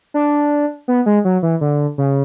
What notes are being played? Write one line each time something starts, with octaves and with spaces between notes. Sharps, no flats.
D4
B3
G#3
F#3
E3
D3
C#3